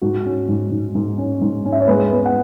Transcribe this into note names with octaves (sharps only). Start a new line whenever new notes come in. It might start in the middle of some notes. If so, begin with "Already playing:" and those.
G#2 F#4
C#4
G#2
G#2
G#2
C#4
G#2
C#4
E5
C#5
G#3 B4
B3
F#5